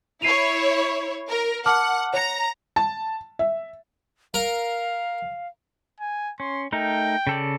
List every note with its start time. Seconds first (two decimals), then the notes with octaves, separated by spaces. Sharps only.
0.22 E4 C#5 C7 D#7 F7
1.30 A#4
1.66 F#5 A5 D6 F6
2.13 C#5 A#5 C#7
2.76 A5
3.39 E5
4.34 A#4 F5
6.00 G#5
6.40 C#4 C6
6.72 A3 D#4 A#4 G5
7.27 C#3 A4 D5